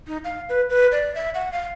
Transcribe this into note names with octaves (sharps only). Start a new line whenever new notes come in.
D#4
F5
B4
B4
D5
E5
F#5
F5